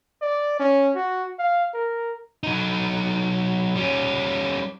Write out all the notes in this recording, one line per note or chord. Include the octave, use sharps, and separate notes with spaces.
D5
C#4
F#4
F5
A#4
F#3 D#4
G3 C#4